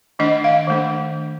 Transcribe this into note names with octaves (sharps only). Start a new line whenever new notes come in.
D#3 A3 D4 D#5
F5
D#3 A3 D4